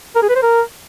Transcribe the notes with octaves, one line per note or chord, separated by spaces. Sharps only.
A#4
G#4
B4
C5
A#4